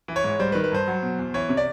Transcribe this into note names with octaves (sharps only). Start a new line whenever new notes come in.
E3
C#5
G#2
G3 C5
B4
D#3
B4
G2 C5
F#3
B2
E2
E3 C#5
C3
D5